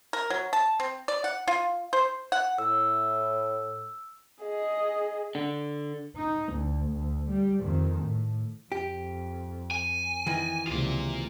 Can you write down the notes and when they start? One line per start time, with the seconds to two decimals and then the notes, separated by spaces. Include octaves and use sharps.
0.13 A#4
0.30 F#3
0.53 A5
0.80 C4
1.08 D5
1.24 F#5
1.47 F4
1.93 C5
2.32 F#5
2.58 A2 E6
4.43 G#4 D#5
5.35 D3
6.17 D#4
6.53 D2
6.92 D2
7.30 G3
7.64 F2 D#3
8.03 A2
8.72 F2 G4
9.71 G#5
10.27 D#3 E3
10.67 C#2 C3 A#3 F4